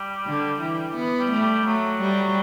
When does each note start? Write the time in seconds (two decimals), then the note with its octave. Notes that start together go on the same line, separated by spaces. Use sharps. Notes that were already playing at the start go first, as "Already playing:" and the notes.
Already playing: G3
0.26 D3
0.61 E3
0.96 B3
1.19 G3
1.31 A3
1.42 G3
1.65 F#3 A3
2.01 G3